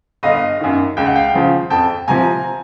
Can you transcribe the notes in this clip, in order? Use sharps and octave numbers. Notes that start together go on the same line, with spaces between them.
G1 D#5 F5
F#2 D#3
C#2 G5
F#5
F5 G5
C#3 F3
F2 G5 A5
C3 F3 G#5 A#5